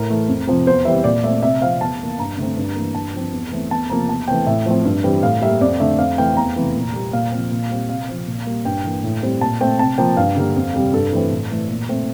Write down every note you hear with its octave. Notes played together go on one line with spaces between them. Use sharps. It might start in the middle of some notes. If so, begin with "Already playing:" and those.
Already playing: A2 A#4
E3 A3
F2
C3 F3
E2 C5
E3 G3 C4 E5
A#2 D5
A3 C4 E5
C3 E5
F3 C4 F5
E2 A5
E3 A#3
G2 A#5
D3 A3 C4
G2
E3 A#3
G2 A5
F3 C4
E2
E3 A3 C4
E2 A5
C3 F3 A#3 A#5
E2 A5
E3 A3 C4 G5
A2 E5
F3 A3 C4
G2
E3 G3 C4
A2 F5
G3 A#3 E5
F2 D5
D3 A3 E5
F2 F5
E3 A3 C4 G5
E2 A#5
C3 E3 A3
A#2
G3 A#3
A#2 F5
F3 C4
A#2
G3 C4
C3 F5
F3 C4
A#2
G3 A#3
G2 G5
E3 A#3
A2
G3 C4
A#2 A5
A3 C4 G5
C3 A5
F3 A#3 G5
G2 F5
D3 G3 A#3
F2
C3 G3
G2 A4
E3 A3 C4
A2
E3 A3
A#2
A3 C4